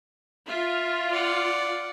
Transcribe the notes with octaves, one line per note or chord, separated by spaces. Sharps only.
F4 E5
D5 F#5